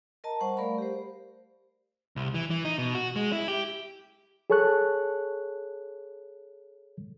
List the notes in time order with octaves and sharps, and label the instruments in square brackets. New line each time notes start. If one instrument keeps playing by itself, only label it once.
[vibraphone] A#4 D#5 A5 A#5
G3 C5 F#5 C#6
A3 A#4 D5 F5 B5
G4 C5
[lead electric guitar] C2
E3
E3
D#4
B2
F#4
G#3
E4
G4
[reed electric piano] G#4 A4 C#5 A5 C#6 F#6